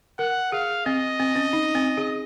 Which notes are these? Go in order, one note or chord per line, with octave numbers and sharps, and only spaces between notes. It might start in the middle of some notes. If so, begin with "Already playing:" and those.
A#4 F#5
G#4 F5
C4 D#5
C4
C#4
D#4
C4
G#4